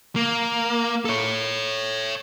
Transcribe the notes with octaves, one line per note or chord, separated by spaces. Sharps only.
A#3
A4 C#5